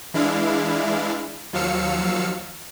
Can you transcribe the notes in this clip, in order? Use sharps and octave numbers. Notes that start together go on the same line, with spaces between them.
E3 G#3 D4 E4 F5
D#2 F3 F#3 F5 E6 C#7